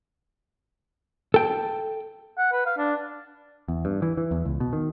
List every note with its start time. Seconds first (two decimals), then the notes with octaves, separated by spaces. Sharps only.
1.34 A4 G5
2.38 F#5
2.52 B4
2.66 F5
2.78 D4
3.68 E2
3.85 G2
4.02 E3
4.17 E3
4.31 E2
4.45 C#2
4.60 B2
4.73 D#3